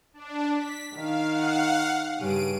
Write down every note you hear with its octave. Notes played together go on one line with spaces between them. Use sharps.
D4
B6
D#3 F5
F5 F#5
G2 C#3 D7 D#7